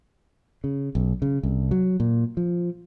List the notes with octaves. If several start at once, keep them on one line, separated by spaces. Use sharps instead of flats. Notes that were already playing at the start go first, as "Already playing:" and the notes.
C#3
B1
C#3
C2
F#3
A#2
F3